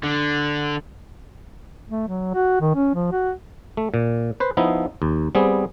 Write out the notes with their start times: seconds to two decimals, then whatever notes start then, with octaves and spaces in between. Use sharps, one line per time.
0.04 D3
1.90 A3
2.08 F#3
2.35 F#4
2.61 D#3
2.75 C#4
2.95 F3
3.12 F#4
3.77 A3
3.94 A#2
4.40 B4 C5
4.57 F3 B3 D#4 E4
5.02 D#2
5.35 G3 B3 C4 G#4